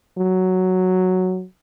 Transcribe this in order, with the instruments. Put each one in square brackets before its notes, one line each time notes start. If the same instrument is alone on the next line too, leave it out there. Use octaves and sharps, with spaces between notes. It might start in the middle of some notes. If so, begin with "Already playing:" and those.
[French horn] F#3